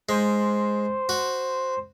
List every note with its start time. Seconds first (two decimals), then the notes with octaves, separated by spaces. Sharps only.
0.09 G#3 C5
1.09 F#4